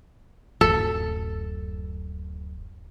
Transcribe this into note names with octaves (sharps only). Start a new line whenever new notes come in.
D1 F#2 A4